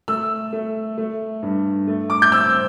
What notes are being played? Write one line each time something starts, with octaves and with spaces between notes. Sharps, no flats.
A3 E6
A3
A3
G2
A3
D6
G6
C4 E6